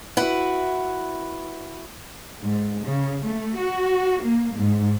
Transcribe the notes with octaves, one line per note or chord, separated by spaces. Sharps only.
E4 F#4 B4 F#5
G#2
C#3
A3
F#4
A#3
G#2